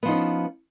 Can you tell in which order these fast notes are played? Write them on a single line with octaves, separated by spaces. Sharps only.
B3 F3 D#4 C#4